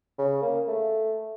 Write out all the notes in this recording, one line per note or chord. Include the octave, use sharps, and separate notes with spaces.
C#3
A#3
A3